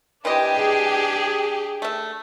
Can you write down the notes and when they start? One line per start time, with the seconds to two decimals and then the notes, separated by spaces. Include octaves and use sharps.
0.25 E3 C4 D4 G4 D#5 G#5
0.57 G#4
1.82 A3 E5